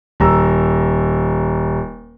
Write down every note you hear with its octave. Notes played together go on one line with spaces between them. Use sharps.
D#1 A#5 E6